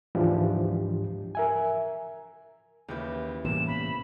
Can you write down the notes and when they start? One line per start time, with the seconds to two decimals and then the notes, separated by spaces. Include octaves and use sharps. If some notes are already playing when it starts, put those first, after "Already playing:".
0.15 D2 G#2 E3 F3 D4 G4
1.35 A#4 E5 G#5
2.88 D#2 C#3 E3 G4 B4 G6
3.45 A2 C3 E3 G3 A#3 B3 C#4 E7
3.67 B5